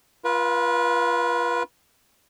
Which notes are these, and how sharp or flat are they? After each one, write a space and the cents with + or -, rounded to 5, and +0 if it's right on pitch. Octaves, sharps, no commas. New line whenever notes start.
F4 -15 B4 -30 F5 +30